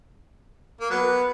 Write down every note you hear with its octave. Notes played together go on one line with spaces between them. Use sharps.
A#3
F#3 B3